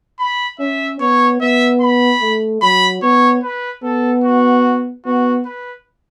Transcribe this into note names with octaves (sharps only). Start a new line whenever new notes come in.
B5
C#4 E5
B3 C#5
B3 E5
B5
A3
F#3 B5
B3 C#5
B4
B3 A4
F#4
B3 F#4
B4